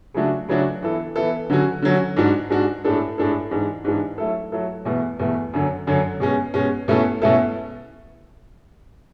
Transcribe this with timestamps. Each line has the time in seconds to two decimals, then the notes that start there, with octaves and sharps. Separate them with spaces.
0.14 C#3 F#3 A3 D4 F#4
0.48 C#3 F#3 A3 D4 F#4
0.83 E3 B3 E4 A4
1.16 E3 B3 E4 A4
1.50 D3 F#3 C#4 F#4
1.82 D3 F#3 C#4 F#4
2.17 G#2 G#3 D4 F#4
2.50 G#2 G#3 D4 F#4
2.84 A2 G#3 D4 A4
3.18 A2 G#3 D4 A4
3.51 G#2 E3 G#3 D4
3.84 G#2 E3 G#3 D4
4.18 F#3 A3 E4 A4
4.52 F#3 A3 E4 A4
4.85 E2 B2 A3
5.19 E2 B2 A3
5.54 F#2 D3 F#3
5.87 F#2 D3 F#3
6.20 B2 G#3 C#4
6.54 B2 G#3 C#4
6.88 B2 A3 C#4 E4 A4
7.22 B2 A3 C#4 E4 A4